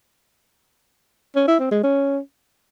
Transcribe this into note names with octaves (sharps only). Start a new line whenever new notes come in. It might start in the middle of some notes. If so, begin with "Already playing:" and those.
C#4
E4
C4
G#3
C#4